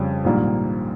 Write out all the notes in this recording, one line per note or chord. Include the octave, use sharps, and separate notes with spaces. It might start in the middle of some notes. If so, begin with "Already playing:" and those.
Already playing: F2 C#3 G3
A#1 G#2 D#3 G3 A#3